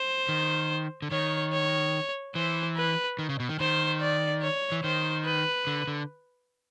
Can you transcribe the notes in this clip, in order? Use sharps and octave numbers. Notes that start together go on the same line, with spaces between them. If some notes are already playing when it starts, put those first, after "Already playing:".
Already playing: C5
D#3
D3
D#3 C#5
C#5
E3 C5
B4
D#3
C#3
B2
D#3
D#3 C5
D5
C#5
E3
D#3 C5
B4
D3
D3